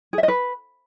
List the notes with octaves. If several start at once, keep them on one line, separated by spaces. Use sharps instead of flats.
G#4
E5
D#5
B4